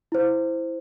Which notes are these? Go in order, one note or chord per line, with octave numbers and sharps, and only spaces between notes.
E4 C5